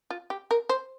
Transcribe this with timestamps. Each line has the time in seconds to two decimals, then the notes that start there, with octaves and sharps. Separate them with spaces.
0.10 F4
0.30 G4
0.51 A#4
0.69 C5